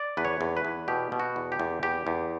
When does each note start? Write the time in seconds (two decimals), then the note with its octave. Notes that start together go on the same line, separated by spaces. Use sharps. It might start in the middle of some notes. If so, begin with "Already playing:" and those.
Already playing: D5
0.17 E2 B4
0.25 C#5
0.41 E2
0.57 B4
0.65 E2
0.88 B2 G4
1.12 B2
1.20 F#4
1.36 E2
1.52 G4
1.60 E2
1.83 E2 G4
2.07 E2